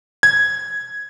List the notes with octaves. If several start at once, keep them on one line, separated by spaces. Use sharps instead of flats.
G#6